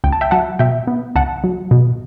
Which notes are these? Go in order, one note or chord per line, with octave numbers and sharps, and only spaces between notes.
C#2 G5
A5
E5 G5
F#3 F#5 A5
B2 E5 G5
B3
C#2 F#5 A5
F#3
B2